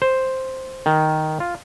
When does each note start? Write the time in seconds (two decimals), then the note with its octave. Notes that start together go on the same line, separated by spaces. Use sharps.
0.02 C5
0.86 D#3
1.40 F4